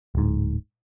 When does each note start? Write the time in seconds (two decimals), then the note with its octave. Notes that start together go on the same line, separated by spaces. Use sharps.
0.15 D1 G#2